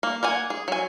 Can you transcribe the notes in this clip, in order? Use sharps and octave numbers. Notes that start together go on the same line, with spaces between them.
A#3
A#3 F#5 G#5
G#4
F#3 G#5